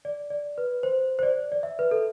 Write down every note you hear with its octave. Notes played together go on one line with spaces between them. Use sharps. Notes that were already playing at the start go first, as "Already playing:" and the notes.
D5
D5
B4
C5
C5
D5
D5
E5
B4
A4